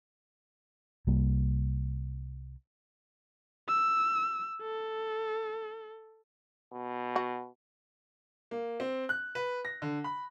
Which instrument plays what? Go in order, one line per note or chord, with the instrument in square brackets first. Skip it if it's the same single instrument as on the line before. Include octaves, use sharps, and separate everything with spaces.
[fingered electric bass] C2 G3 A#3
[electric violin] E6
A4
[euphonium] B2
[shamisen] F#4
[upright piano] A#3
C4
F#6
B4
A#6
D3
B5